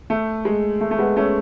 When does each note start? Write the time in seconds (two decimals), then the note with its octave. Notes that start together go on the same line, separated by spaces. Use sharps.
0.10 A3
0.45 G#3
0.81 A3
0.91 A3
0.99 G#3 B3
1.17 A3 C#4